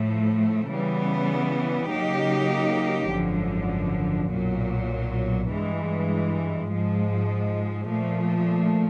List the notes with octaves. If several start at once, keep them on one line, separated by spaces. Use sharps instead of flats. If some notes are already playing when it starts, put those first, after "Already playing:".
Already playing: A2 F3 A3
C#3 E3 G3 B3
C#3 F#3 A#3 D#4 G4
G#1 F#2 D3 F3
B1 A#2 F#3
G2 E3 G#3
G#2 F3 G#3
A#2 F3 A3